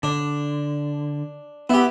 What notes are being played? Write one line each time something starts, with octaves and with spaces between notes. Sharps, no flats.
D3 D4
B3 E4 G4